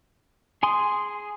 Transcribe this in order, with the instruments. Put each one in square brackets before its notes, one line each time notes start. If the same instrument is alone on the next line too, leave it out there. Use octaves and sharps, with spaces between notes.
[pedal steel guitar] G#4 G#5 C6 D#6